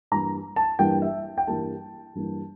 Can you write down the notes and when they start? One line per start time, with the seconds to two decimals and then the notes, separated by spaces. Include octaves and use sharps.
0.11 G2 E3 G3 A#3 A#5
0.56 A5
0.79 G2 E3 G3 A#3 G5
1.02 E5
1.38 G5
1.47 G2 E3 G3 A#3 A5
2.15 G2 E3 G3 A#3